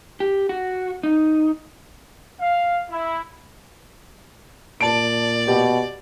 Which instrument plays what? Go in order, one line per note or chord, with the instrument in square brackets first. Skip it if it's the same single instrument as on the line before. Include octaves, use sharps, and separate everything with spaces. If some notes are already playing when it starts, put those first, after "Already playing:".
[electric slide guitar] G4
F#4
D#4
[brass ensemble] F5
E4
[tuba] A#2 [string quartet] D5 [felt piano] A5 D7
[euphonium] B2 [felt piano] G4